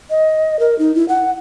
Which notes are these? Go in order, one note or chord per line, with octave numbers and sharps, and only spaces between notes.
D#5
A#4
D#4
E4
F#5